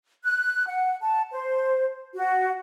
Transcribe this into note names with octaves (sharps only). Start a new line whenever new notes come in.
F#6
F#5
A5
C5
F#4